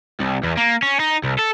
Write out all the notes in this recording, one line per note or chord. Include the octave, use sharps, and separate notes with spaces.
C2
E2
A#3
C#4
D#4
C2
A4